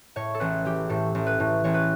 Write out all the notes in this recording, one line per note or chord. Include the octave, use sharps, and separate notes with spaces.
A2 C#5
A4
A1 B4
E3 G4
A2 A4
A1
B4
A2
A1 C#5
B4